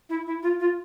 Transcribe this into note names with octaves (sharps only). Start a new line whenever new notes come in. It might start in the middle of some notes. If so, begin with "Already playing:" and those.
E4
E4
F4
F4